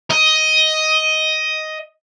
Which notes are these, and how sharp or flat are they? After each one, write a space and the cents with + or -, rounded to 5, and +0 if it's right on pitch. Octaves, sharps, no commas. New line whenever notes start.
D#5 +10